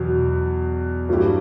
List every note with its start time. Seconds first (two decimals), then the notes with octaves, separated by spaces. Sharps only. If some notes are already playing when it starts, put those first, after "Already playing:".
Already playing: E2 B2 F#3
1.09 G2 F#3 A3 E4 G4